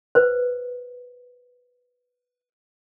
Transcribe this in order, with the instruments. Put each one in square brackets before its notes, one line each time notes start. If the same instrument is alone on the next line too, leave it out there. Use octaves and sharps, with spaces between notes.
[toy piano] B4 C5